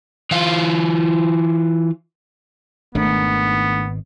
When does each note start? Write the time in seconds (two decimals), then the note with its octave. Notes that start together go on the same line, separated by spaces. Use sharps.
0.31 E3 F4
2.95 G#1 B2 D#3 A3 B3 D4